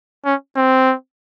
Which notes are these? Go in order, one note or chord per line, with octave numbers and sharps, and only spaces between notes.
C#4
C4